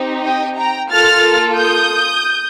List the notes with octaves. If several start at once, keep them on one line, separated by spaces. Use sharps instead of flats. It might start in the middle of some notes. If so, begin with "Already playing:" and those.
Already playing: C4 D#4 G4
D#5 G5
G5 A#5
A#3 F4 A4 F6 A6
D#6 G6